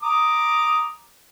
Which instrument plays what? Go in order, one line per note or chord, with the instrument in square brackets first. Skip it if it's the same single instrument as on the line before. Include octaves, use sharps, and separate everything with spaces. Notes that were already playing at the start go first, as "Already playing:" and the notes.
[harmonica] A#5 D6 D#6